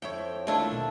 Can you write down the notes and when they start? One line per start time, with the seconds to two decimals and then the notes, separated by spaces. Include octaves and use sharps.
0.02 F2 E4 C#5 G5
0.47 D#2 A3 D4 E4 F4 E5
0.71 B2 B3